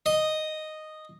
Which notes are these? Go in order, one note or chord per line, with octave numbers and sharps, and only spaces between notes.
D#5